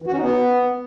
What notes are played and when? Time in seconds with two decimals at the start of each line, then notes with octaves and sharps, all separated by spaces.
0.02 E3
0.07 F#4
0.12 C#4
0.17 D#4
0.22 B3